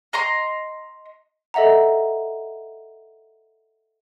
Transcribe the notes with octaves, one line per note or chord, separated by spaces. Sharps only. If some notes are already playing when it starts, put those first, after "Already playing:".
D#5 A#5 C6
A4 D#5 E5 F#5 A#5